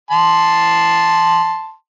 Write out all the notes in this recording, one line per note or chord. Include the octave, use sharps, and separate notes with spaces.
A5 C6